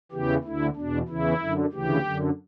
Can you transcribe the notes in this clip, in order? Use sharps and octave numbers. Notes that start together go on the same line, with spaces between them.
E2 C#3 E3 G4
D2 D3 E4
E2 B2 D4
E2 C#3 E3 E4
F#2 D3
D2 C#3 E3 G4
F#2 D3